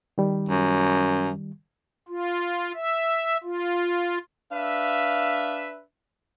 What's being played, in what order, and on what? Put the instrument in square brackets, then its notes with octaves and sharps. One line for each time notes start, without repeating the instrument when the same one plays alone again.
[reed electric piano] D#3 G3
[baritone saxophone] F#2
[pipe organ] F4
E5
F4
[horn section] D4 B4 E5 [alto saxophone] F5